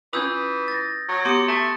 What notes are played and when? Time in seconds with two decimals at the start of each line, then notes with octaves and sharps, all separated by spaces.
0.13 E3 C#4 F4 B4 D#6 E6 G6
0.68 A6 A#6
1.08 F#3
1.25 B3 G4 C6 D6 D#6 C#7
1.48 A3